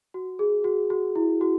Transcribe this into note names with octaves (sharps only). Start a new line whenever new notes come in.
F#4
G#4
F#4
F#4
E4
F#4